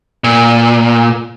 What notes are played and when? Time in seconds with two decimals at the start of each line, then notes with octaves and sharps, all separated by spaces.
0.24 A#2